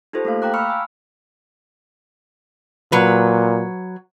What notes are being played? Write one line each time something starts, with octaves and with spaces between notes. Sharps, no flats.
D#4 F4 G4 A4 C5
A3 A#3 F5
F5 G5 A#5 D6 F#6
B5 C#6 E6 F6 C#7
G#5 E6
A#2 F#3 B4